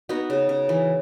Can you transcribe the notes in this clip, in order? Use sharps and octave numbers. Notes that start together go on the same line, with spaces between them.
B3 D#4 F#4
C#3
C#3
E3